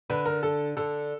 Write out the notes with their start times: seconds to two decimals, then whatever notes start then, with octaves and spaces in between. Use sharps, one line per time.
0.10 D3 B4
0.26 A#4
0.43 A4
0.77 D3 A4